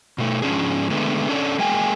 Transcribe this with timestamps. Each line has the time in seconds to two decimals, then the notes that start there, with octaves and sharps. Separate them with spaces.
0.18 B2 A3
0.42 G#2 F3 C#4 D4 G#4
0.90 D3 G#3 A3 B3
1.29 C#4 D4 A4 C#5 D5
1.59 G#3 A#3 G5 G#5